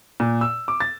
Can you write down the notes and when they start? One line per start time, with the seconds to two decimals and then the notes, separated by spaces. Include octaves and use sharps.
0.20 A#2
0.41 E6
0.68 D6
0.80 A6